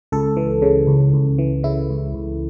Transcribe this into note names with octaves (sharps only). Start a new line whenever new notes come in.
C#2 A4
E3
C#3
C#2
C#2
E3
C#3 E4
C#2
C#2